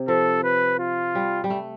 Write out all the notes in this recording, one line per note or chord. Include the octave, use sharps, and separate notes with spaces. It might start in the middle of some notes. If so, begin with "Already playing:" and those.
Already playing: C3
F3 A4
B4
F4
G3
G3
A3